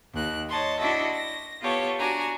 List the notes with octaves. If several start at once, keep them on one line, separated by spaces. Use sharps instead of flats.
D#2 F#6
C#5 D#5 A5 C6
D4 E4 F#4 A4 D#5 E5
A#6
B3 F4 G4 A4 C#5
D4 F#4 G#5 A#5